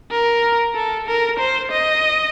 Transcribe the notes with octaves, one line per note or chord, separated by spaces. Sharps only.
A#4
A4
A#4
C5
D#5